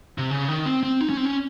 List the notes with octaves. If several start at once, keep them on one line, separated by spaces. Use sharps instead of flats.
C3
C#3
D#3
C4
C4
D#4
C#4
C4
C#4